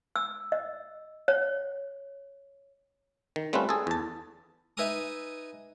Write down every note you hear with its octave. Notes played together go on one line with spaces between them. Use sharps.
E6
D#5
C#5
D#3
G3 A3 C4 C#4 F4 B4
G#4 A4
E2 A5
D#4 B4 E5 G#5 A#5 D#6